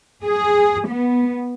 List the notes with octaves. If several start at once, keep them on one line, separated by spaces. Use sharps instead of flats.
G#4
B3